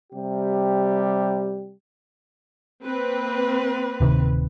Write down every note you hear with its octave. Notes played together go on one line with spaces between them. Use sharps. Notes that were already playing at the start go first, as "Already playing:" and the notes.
C3 G3 G4
A#3 C4 B4
D1 C3 D#3